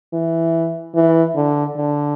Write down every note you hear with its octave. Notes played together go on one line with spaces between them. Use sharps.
E3
E3
D3
D3